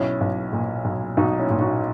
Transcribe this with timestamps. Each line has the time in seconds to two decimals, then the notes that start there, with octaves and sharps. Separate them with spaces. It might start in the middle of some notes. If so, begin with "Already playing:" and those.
Already playing: B1 C#4 E4
0.21 B1
0.53 A#2
0.85 B1
1.17 B1 D#4 F#4
1.39 C#4 E4
1.50 A#2
1.60 D#4 F#4